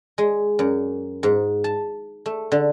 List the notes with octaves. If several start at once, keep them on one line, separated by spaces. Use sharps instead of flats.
G#3
F#2
G#2
A5
A3
D3